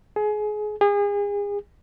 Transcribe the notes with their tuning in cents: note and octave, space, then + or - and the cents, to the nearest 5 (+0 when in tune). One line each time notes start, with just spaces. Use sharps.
G#4 +25
G#4 -35